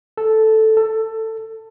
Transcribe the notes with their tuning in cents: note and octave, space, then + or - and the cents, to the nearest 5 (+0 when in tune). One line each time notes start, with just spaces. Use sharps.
A4 -5
A4 +15